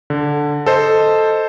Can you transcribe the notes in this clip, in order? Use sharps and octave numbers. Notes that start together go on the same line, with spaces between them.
D3
A4 C5 D#5